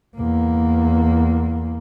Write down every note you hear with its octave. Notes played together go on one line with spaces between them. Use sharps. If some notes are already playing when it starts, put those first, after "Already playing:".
E2 A#3